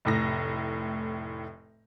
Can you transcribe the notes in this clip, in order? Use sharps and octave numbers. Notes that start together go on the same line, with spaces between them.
F1 A2 A#6